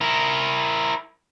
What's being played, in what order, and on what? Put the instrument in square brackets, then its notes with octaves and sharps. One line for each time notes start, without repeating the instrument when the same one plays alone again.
[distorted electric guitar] E4 A#4